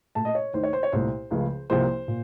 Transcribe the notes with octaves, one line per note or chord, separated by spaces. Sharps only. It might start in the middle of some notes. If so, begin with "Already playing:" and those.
A#2 A3 A5
D#5
C#5
D#2 D#3 A3 C5
C#5
C5
C#5
C2 A#2 A3 C5
C#2 C#3 F3 A3
C2 C3 F3 A#3 C5
A#2